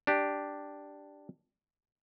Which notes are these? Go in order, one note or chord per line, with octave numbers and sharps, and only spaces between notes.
D4 G4